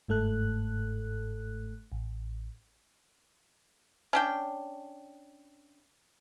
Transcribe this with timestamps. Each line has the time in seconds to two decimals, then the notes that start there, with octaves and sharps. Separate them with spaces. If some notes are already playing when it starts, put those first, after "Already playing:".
0.08 G1 G#2 A3 A4 F#6
1.92 A1
4.13 C#4 D4 G5